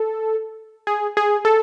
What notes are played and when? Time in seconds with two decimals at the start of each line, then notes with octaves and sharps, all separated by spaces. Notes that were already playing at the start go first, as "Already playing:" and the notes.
Already playing: A4
0.87 G#4
1.17 G#4
1.45 A4